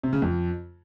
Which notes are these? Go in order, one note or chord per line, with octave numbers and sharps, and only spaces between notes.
C3
C#3
F2